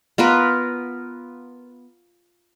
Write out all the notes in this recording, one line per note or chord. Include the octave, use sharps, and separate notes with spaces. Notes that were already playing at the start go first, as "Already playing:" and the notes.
B3 F4 A#4 B4